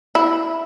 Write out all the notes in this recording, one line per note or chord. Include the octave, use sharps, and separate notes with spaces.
E4